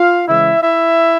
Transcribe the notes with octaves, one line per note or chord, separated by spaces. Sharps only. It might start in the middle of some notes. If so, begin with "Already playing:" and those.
Already playing: F4 F5
C#3 E3 G#3 E4 E5
E4 E5